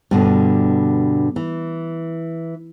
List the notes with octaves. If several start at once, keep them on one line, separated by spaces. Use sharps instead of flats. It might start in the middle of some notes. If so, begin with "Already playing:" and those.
G2 B2 D3
E3